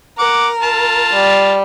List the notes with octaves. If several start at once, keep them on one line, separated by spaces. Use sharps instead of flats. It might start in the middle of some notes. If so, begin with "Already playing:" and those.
A#4 F#5 D6
F4 A5
G3